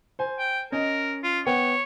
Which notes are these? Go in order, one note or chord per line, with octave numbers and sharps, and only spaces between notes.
C5 G#5
G5
C#4 A#4 D#5
F4
B3 C#5 G5